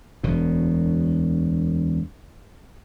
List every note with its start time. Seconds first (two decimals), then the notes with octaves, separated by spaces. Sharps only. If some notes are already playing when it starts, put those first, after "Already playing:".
0.23 E1 D2 B2